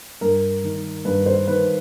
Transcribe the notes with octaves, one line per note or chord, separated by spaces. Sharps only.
G2 A#4
D#3
G2 B4
C5
D#3 B4